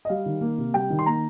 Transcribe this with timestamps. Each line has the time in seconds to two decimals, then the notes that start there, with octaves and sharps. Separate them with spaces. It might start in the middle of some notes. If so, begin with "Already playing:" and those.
0.05 D#5
0.09 G3 F5
0.26 D#3
0.41 A#3
0.58 C3
0.74 G3 G5
0.90 D#3
0.99 C6
1.06 A#3 A#5